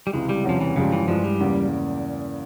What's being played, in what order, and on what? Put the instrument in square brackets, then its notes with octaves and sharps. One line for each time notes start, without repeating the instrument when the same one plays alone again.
[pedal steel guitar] G3
[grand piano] C#2 C3 E3 [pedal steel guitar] G#3
[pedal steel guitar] G3
[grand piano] E2 C3 G3 C#4 [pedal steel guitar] F3
[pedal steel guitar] E3
[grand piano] G2 F3 G#3 C#4 G4 [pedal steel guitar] C#3
[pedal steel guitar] E3
[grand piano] G2 E3 G#3 [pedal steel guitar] F3
[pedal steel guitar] G3
[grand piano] E2 C#3 E3 A#3